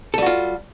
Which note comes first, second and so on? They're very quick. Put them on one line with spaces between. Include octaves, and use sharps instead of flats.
A4 G3 F#4 F4